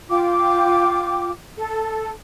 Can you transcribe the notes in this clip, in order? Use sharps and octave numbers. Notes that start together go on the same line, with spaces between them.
F4 G5 D6
A4